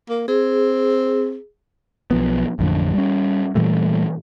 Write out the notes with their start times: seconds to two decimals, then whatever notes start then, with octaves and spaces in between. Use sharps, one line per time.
0.09 A#3
0.28 C4 G#4
2.11 B1 F3 B3
2.59 A1 F2 D3
2.94 G3 C#4
3.55 A#2 E3 G3 A3